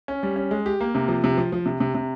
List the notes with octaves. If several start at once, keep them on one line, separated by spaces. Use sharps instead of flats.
C#4
G3
C#4
G#3
G4
A#3
C3
F3
C3
F3
F3
C3
C3
C3